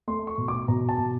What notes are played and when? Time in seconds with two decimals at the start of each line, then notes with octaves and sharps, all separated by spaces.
0.07 A3 C6
0.27 C#6
0.38 B2
0.48 D6
0.68 B2 A#5
0.89 A5
0.98 B2